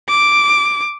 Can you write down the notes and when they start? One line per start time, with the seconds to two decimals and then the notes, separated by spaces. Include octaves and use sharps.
0.09 D6